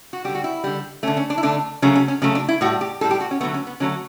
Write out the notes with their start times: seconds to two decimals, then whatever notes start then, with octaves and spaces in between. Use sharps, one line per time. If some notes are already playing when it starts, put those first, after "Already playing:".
0.13 F#4
0.25 G3 G4
0.28 D3
0.35 F#4
0.44 E4
0.64 D3 G3
1.03 A3 C#4
1.08 D3
1.17 C#4
1.30 D4
1.38 E4
1.43 D3 A3 D4
1.82 C#3 F#3 A3 C#4
1.96 C#4
2.08 C#4
2.22 C#3 F#3 A3 C#4
2.35 D4
2.49 E4
2.61 A2 G3 F#4
2.81 G4
3.01 A2 A4
3.04 G3
3.11 G4
3.20 F#4
3.31 C#4
3.41 D3 F#3 A3 B3
3.54 C#4
3.67 B3
3.80 D3 F#3 A3 C#4